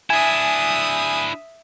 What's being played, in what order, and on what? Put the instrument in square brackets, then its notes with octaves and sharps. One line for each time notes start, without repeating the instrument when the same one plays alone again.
[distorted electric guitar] D4 E4 [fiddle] E5 D#6 [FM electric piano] G#5